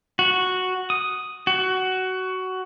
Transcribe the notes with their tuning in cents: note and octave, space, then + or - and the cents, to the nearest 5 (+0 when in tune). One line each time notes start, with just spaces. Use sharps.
F#4 -5
D#6 +0
F#4 +15